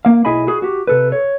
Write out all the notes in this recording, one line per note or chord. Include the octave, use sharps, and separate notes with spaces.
A#3 F5
B1 E4 G#4 D#5 G#5 B5
F#4 G#4
F#4 G4
C3 A4 B4
C#5